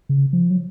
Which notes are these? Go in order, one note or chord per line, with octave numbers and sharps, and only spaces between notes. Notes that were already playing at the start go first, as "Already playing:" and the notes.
C#3
F3
F#3